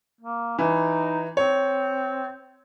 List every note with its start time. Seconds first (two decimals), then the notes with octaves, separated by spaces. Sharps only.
0.21 A#3
0.59 E3 D#4
1.37 C4 C#5